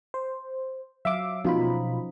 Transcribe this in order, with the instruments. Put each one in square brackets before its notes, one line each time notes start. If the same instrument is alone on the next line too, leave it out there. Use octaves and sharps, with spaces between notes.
[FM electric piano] C5
[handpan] F#3 F5 [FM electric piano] E5 D6
[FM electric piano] B2 F4 B5 [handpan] F3 C#4 D#4